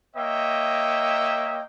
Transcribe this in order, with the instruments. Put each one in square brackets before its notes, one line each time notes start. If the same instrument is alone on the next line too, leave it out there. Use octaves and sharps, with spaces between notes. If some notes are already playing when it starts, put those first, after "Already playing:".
[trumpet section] A#3 C#5 D#5 E5 G5